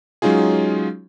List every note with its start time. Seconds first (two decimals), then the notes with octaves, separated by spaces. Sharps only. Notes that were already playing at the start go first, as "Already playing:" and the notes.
0.22 F#3 G#3 C#4 D#4 F4 G#4